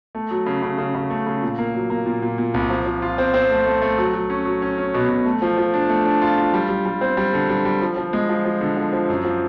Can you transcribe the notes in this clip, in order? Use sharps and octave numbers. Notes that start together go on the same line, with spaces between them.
A3
F#3
C#3
C#3
C#3
C#3
A3
C#3
A#2
A#3
F#3
A#3
A#2
A#2
A#2
C2
F3
F3
F4
C4
C4
A3
A3
A3
F#3
F#3
C#4
F#3
C#4
C#4
B2
B2
A3
F3
F3
D4
A3
D4
F4
F4
G3
G3
G3
C4
G3
D3
G3
G3
F3
F3
G#3
F3
F3
D3
F3
F3
F#2
F3